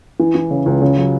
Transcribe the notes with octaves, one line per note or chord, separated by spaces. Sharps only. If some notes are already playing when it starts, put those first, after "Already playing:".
E3
E3
C#3
C#2
C#3
F#3